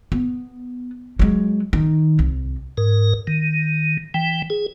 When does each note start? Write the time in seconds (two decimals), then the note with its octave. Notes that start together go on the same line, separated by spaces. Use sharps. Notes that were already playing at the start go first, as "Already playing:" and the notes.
0.12 B3
1.19 F#3 G#3
1.73 D#3
2.19 C2
2.78 G#2 A#4
3.27 D#3
4.14 E3 G5
4.50 G#4